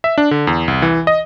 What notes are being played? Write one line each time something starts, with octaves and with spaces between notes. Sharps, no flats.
E5
D4
D3
E2
C2
E3
D#5